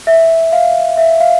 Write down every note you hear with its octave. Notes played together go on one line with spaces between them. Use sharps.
E5
F5
E5
F5